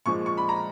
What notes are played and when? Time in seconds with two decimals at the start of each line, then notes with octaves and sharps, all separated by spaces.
0.06 A#2 F3 G#3 C#6
0.26 C#6
0.37 B5
0.49 A#5